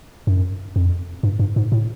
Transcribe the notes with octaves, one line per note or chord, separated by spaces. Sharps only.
F#2
F2
G2
G2
G#2
A2